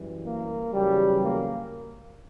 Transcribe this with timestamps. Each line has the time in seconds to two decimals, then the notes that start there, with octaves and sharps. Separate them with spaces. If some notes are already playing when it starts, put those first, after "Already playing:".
Already playing: F#2 E3 G3
0.24 A#3
0.72 E2 C#3 F#3 G3
1.22 A#3